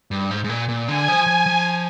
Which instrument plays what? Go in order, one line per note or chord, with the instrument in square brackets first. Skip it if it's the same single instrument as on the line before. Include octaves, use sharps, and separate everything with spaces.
[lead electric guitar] G2
G#2
G#2
A#2
A#2
[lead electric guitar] D3 [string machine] G#5
[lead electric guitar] F3
F3
F3